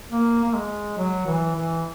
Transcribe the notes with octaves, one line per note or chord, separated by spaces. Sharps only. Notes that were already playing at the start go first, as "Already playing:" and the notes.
A#3
A#3
G#3
F#3
E3
E3